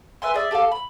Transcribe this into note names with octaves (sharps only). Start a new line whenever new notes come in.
B4 E5 G#5 C6
G#4 D5 E5
G4 A4 D#5 F5
B5